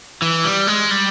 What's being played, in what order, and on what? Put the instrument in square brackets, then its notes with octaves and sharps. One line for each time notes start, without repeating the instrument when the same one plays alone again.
[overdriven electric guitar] E3
G3
G#3
G3